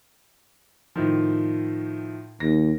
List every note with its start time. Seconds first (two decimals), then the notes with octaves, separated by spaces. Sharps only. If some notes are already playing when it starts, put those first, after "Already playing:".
0.96 A2 D#3 F3
2.40 D#2 A#6